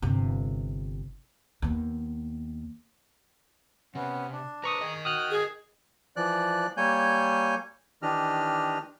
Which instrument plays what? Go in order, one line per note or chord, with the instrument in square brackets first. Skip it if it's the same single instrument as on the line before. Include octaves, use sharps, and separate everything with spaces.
[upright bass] G1 C3
D#2 B3
[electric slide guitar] C3 [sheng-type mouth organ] B3 C#4
[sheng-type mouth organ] D4
[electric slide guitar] A#4 B4 [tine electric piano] A#5 C#6 D#6
[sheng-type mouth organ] G#4 [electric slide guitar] A#4 D#5
[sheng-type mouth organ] F#4 G5 [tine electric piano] D#6 F6 F#6
[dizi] G#4
[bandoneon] E3 F3 D5 F#6
G3 A#3 C#5 G#5 G6
D#3 E3 D4 G4 D#5 F6